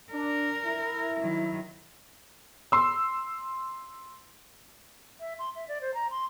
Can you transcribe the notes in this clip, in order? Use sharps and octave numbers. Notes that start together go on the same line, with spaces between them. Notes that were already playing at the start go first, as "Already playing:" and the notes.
D4 A#4
E4
D#3 F#3
C6 E6
E5
C6
E5
D5
C5
A#5
C6